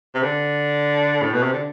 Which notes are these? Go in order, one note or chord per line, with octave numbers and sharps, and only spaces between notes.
C3
D3
A2
B2
C3
D3